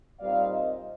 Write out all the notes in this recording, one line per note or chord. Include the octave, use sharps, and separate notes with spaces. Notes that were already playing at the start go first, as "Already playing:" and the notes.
A#2 G3 C4 D#4 D5 F5
C5 D#5